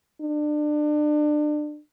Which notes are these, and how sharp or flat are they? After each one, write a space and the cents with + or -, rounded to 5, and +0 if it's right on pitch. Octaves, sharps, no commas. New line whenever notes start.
D4 +30